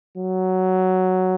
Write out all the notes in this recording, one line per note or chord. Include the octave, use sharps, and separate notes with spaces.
F#3